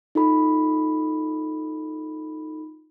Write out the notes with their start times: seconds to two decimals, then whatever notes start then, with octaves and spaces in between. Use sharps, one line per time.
0.15 D#4 F4 A4 B5